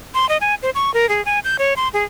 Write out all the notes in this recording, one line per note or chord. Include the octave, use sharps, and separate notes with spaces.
C6
D#5
G#5
C5
C#6
A#4
G#4
G#5
G6
C#5
C6
G#4